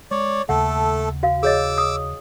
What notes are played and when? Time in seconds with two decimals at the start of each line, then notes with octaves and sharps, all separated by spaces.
0.11 G#3 C#5 D5
0.49 D#2 C#3 A3 A4 F#5
1.23 F#4 F5
1.43 G#4 C#5 D#5 D6 E6
1.78 D#6